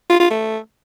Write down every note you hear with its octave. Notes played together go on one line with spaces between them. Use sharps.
F4
F4
A3